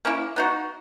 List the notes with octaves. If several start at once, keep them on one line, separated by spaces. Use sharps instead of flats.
A#3 C#4 E4
B3 D#4 F#4